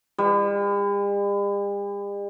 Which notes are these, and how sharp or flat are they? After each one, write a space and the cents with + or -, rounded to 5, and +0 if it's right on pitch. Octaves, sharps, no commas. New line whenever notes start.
G3 +45